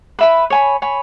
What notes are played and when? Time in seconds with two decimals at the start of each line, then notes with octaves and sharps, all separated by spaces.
0.19 B4 E5 B5
0.50 C#5 G#5 B5
0.82 C#5 G#5 B5